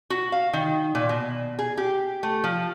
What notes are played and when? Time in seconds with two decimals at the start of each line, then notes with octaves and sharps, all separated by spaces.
0.10 F#4
0.32 F5
0.53 D#3
0.95 A#2
1.09 B2
1.59 G#4
1.78 G4
2.23 A3
2.44 F3